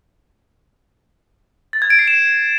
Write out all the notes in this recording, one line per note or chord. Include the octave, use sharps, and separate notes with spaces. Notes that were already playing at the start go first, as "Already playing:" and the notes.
A6
G#6
D7
C7
E7